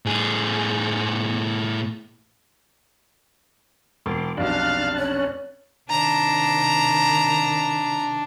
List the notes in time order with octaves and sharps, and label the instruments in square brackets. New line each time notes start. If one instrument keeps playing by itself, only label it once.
[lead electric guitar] A2 G#4
[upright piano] E1 [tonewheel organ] C6 D6
[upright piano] F1 B1 [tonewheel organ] D4 A5 F#6 [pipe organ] F5
[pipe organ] C#4 [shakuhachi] C#5
[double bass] C3 D#3 [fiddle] D4 [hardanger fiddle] A#5